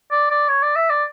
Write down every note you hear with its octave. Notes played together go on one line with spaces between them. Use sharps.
D5
D5
C#5
D5
E5
D5